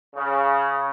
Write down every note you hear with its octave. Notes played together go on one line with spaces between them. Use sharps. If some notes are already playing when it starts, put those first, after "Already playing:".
C#3